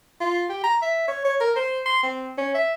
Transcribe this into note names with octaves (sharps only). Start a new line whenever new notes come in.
F4
G4
A#5
E5
C#5
C#5
A#4
C5
C6
C4
C#4
E5